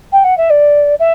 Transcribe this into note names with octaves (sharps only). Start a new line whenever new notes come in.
G5
F#5
E5
D5
E5